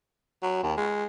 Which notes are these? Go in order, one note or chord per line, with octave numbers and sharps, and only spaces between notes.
F#3
D#2
G#3